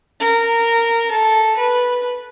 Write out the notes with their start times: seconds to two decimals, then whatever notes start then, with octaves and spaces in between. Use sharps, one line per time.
0.20 A#4
1.11 A4
1.57 B4